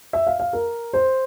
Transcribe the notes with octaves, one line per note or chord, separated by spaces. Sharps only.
E5
F5
F5
A#4
C5